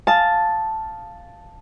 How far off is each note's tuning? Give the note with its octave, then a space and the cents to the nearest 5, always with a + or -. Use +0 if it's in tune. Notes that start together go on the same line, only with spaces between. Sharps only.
F5 +0 A5 +0 D#6 +0